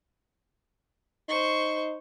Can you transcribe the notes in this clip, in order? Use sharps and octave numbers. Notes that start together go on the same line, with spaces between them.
D#4 C5 C#6